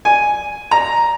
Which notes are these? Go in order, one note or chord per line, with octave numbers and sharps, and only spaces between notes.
G#5
A#5